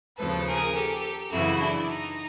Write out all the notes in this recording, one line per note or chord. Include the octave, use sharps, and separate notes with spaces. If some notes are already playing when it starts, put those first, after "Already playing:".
D#2 C#3 F3 A4 B4
G#4 A#4
G4 A4
F#2 C#3 E3 E4 F#4
D4 E4
D#4